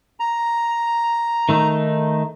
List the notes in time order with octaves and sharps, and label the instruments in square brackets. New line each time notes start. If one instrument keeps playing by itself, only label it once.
[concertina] A#5
[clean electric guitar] D#3 A3 D#4